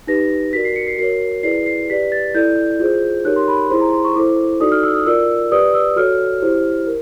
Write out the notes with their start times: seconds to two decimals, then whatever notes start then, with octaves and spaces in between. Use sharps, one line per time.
0.07 D#4 G4 B4 A#6
0.53 F#4 A#4 D5 B6
0.64 C7
0.76 C#7
0.87 C7
0.98 F#4 A#4 C#5 C7
1.43 E4 G#4 B4 D5 C7
1.66 C7
1.90 G4 B4 D5 B6
2.12 A6
2.35 E4 A4 D5 G6
2.79 F4 G#4 C5
3.25 D#4 G4 A#4 C#5 F#6
3.36 C6
3.48 B5
3.70 E4 G#4 C5 C6
3.81 A#5
3.92 C6
4.04 C#6
4.16 E4 A4 C5 D6
4.60 D#4 F#4 A4 D5 D#6
4.72 F6
4.83 E6
4.95 D#6
5.06 F4 A#4 D5 E6
5.51 G4 B4 D5 D#6
5.74 E6
5.96 F#4 A4 C#5 F6
6.42 E4 G4 C5
6.87 A#4